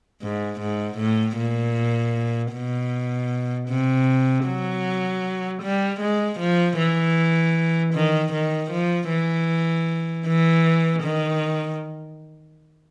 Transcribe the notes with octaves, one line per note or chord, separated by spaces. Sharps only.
G#2
G#2
A2
A#2
B2
C3
F#3
G3
G#3
F3
E3
D#3
D#3
F3
E3
E3
D#3